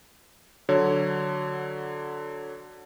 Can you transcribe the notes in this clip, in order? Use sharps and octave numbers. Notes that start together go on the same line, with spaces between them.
D3 F#3 C#5